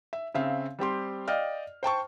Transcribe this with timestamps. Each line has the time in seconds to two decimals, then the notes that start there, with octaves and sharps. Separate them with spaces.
0.13 E5
0.35 C#3 C4 E5 F5
0.79 G3 C4 G4 C6
1.28 D5 D#5 F5 G5 F6
1.83 C5 G5 A5 C#6